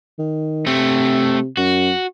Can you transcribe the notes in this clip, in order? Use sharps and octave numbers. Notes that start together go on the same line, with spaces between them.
D#3
C3 A3 C4
F#2 F#4